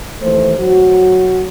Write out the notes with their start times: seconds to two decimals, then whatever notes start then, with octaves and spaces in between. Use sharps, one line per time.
0.22 D#2 E3 A3 C5
0.58 F#3 F#4